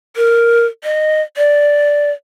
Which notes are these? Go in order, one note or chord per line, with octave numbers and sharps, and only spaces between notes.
A#4
D#5
D5